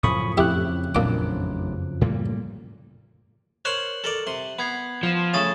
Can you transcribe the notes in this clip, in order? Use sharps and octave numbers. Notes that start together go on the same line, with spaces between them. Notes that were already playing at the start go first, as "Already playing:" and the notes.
F#2 A2 C#3 F3 C#4 B5 C#6 D#6
F2 E4 G4 E5 F#6
A1 A#2 F#3 D4 D6
A2 G3 A#3
A#4 C5 C#5 F#6 F#7
A4 A#4 D5
C3 C6
B3 B5 G#6 C7
F3
C#3 A3 D#6 A6 E7